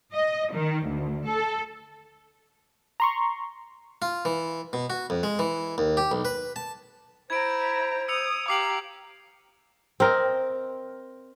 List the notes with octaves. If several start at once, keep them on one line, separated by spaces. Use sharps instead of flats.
D#5
D#3
D2
A4
A#5 C6 C#6
F4
E3
B2
F#4
F2
G#3
E3
D#2
G4
B1
B4
A5
E4 C5 A#5 G#6 D7
D#6 E6 C#7 F7
G4 F5 A#5 D6 C7 F#7
C4 A#4 D#5